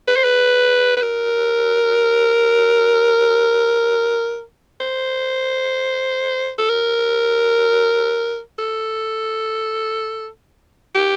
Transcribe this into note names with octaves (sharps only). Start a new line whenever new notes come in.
B4
C5
B4
B4
A#4
C5
A4
A#4
A4
G4